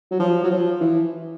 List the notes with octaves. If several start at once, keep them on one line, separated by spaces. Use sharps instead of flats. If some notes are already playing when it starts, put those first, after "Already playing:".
F#3
F3
F#3
F3
E3